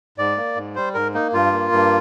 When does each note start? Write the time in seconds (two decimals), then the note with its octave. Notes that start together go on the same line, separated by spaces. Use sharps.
0.18 G#2 D5
0.37 A#3
0.56 G#2
0.75 G3 C5
0.94 G#2 A#4
1.14 A#3 D#4
1.33 G2 F4
1.52 A#3
1.72 G2